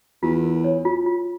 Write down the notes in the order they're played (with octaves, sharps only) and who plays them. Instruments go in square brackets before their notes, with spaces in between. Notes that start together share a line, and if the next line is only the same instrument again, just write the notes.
[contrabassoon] E2 [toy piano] F4
[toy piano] A#4
C#5
F4
F4